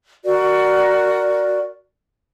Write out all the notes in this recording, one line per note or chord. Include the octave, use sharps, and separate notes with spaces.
F#4 A#4 D5